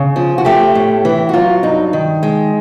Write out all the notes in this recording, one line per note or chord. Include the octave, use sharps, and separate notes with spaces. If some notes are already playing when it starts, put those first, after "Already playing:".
Already playing: C#3
F3
F#4
A3 G4
A2
E3
F#4
F#3 F4
G2 D#4
D#3
G#3